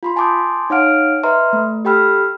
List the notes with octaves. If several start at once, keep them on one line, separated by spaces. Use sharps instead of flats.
F4 B5 C6
G#5 A5 C6 D6 D#6 G6
D#4 C#5 F5 F#5 F6 D7
B4 D#5 E5 A#5 C6 F6
A3
G4 A4 G5 B5 E6 F6